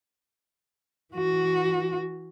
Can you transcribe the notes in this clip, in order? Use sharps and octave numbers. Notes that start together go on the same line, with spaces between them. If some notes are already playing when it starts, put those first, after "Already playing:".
E3 F#4